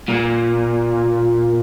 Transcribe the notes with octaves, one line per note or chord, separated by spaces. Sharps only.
A#2